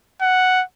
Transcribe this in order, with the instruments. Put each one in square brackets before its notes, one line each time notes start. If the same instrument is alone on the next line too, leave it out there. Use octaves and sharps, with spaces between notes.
[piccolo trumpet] F#5